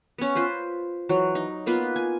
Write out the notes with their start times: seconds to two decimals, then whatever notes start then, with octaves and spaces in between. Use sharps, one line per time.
0.18 B3 C#4
0.35 F4 B4 C5
1.09 E3 F#3
1.35 D#4
1.66 A#3 B3 F4 B4
1.96 G#5